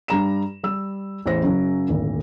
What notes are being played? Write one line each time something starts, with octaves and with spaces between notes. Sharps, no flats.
G2 G3 A#5 E7
G3 E6
A1 E2 C5 A#6
F#2 C#3 F#3
D#1 G#1 D2